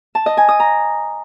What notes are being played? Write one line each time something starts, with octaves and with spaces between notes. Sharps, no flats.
A5
D#5
G#5
D#6
A#5